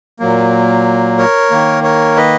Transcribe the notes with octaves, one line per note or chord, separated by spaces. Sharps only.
A#2 F#3 A#3
A#4 C#5
D#3 A#3
A#4 C#5
B4 D#5